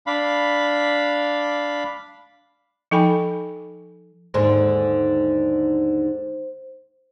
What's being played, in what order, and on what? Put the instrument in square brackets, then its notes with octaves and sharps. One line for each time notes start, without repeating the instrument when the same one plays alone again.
[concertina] D4 F5 B5
[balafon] F3 D#4 A4 G5 G#5 B5
[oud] D#2 G#2 D3 [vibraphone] C5